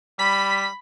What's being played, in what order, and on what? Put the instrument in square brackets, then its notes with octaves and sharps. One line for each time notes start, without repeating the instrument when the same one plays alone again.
[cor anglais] G3 [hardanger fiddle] B5 [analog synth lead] B6